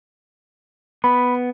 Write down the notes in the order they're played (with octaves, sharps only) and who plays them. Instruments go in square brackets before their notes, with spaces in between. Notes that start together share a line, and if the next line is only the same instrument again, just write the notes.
[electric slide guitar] B3 [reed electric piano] B5